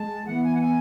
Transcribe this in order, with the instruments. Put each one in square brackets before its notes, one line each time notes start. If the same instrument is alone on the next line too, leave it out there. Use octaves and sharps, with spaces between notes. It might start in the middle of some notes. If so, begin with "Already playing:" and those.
Already playing: [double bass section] G#3 [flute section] A5
[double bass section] E3 B3 [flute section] F#5
[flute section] G#5
F#5
G#5